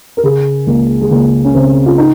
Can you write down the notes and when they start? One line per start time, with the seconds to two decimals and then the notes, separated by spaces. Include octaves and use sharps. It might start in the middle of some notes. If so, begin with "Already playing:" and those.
0.17 A#4
0.23 C#3 G#4
0.67 C#2 A#3
1.01 G#3
1.11 C#2 A#3
1.44 C#4
1.54 C#3 C4
1.86 F4
1.98 D#4